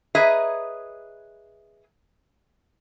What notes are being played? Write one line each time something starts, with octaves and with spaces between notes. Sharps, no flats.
G#4 B4 C#5 D#5 E5 A#5